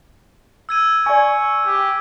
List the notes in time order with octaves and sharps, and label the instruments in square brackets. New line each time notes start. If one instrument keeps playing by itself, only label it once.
[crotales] E6 G#6 D#7
[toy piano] D5 G#5 [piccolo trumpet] C#6
[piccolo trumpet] G4